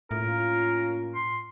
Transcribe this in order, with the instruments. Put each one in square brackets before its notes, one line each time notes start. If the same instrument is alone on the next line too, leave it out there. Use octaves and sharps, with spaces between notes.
[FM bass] A2 [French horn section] A#3 C#4 F4 [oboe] A#4
[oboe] C6